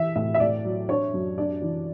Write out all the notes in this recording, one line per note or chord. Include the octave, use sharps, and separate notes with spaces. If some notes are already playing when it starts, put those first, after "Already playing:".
Already playing: E3 E5
A2 E5
E5
A2 D5
F#3
D4 C#5
F#2
D4 D5
E3